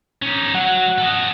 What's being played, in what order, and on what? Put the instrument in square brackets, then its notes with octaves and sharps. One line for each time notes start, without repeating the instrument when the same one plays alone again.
[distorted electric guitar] C#4 D#4
[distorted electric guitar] F#3 [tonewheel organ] F#5
[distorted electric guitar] A4 D#5